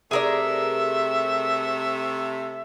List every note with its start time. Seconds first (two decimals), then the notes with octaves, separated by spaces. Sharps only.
0.11 C3 A3 G#4 A#4 D5 E5